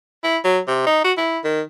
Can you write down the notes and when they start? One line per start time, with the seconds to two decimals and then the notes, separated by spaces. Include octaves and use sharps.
0.24 E4
0.44 F#3
0.68 C3
0.86 D#4
1.04 F#4
1.17 E4
1.44 D#3